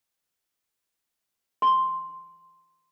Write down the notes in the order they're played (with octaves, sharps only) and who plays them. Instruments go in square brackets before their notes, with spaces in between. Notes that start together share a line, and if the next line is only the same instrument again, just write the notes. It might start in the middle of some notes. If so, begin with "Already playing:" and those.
[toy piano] C6